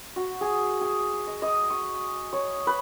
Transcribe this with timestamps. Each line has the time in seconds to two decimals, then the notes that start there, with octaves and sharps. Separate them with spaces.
0.16 F#4
0.41 G#4
0.81 G#4
1.27 D#5
1.42 D#5
1.70 C#6
2.33 C#5
2.67 B4